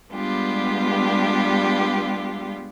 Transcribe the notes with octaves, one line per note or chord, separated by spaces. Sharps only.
G3 G#3 B3 D4 F4 G4